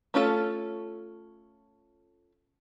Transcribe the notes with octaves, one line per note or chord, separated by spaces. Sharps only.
A3 C#4 F4 F#4 A4